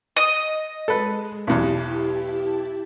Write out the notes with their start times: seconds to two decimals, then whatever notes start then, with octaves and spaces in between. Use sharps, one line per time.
0.16 D#5
0.88 G#3 A4 B4
1.47 B1 E2 E4 G4 A5